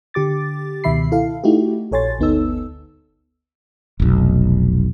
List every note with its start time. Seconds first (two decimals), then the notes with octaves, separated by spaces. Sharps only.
0.14 D3 G4 D6 A6
0.84 C#2 B2 D#3 E5 B5 C7
1.12 E4 A4 F5
1.44 A3 D#4 E4 F#4 G4
1.92 A#1 A4 C#5 G#5 C6 A6
2.19 G1 D2 B3 D#4 A4 E6
4.00 F1 B1